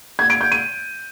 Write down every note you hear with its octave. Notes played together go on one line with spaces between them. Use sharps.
G#6
D7
G6
D#7